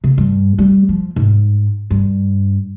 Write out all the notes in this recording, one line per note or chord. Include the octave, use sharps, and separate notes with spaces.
C#3
G2
G3
F3
G#2
G2